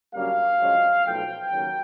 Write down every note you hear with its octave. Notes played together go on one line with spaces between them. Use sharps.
F#2 D3 G3 A#3 C#4 F5
F#2 D3 F3 G#3 C#4
B1 A2 F3 G5
D#2 C#3 F#3 A#3